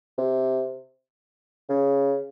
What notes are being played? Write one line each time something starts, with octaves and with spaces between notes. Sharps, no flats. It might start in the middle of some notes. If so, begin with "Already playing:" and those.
C3
C#3